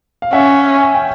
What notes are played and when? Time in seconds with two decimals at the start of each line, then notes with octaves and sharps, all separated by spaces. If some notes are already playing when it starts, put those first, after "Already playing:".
0.22 F5
0.33 C#4 E5 F#5
0.82 G#5
0.94 G5